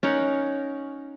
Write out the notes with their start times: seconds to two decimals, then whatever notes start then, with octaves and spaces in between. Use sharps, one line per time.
0.03 C#4 D#4 A#4 F#5